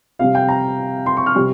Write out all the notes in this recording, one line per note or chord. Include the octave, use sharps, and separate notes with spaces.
C3 G3 F5
G5
A#5
C6
C#6
F6
C3 G3